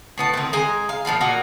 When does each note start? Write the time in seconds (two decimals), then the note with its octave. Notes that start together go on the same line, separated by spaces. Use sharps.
0.18 A2 B3 A5
0.34 D#3 C4
0.53 G#3 D#5 G#5 A#5
0.89 F5
1.05 A#2 F3 B3 F4
1.21 A#2 D#4 F#4 A#5